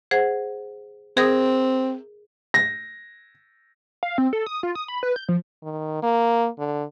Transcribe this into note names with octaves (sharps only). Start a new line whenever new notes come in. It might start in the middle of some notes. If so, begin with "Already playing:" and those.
G#4 C5 F#5
C4 G#4 A#4 D#6
A#6
F5
C4
A4
D#6
F4
D#6
B5
B4
G6
F3
D#3
A#3
D3